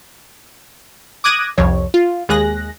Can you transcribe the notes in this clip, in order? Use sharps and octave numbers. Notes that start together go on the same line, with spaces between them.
D6 D#6 F#6 G#6 A#6 D#7
C2 F2 C#5
F4
D#2 G#3 G#4 F#6 A#6